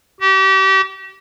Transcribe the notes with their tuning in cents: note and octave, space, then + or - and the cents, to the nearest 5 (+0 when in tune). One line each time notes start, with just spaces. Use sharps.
G4 -35